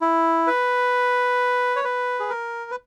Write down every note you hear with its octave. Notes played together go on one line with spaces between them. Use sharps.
E4
B4
C#5
B4
G#4
A#4
B4